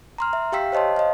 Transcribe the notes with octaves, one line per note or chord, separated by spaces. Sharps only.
A#5 C6 F6
E5
G4 F5 G5 E6 B6
C5 C#5 D#5 A5 C6
D#5 F5